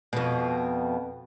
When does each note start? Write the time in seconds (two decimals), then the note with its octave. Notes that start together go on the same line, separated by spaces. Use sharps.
0.13 F2 B2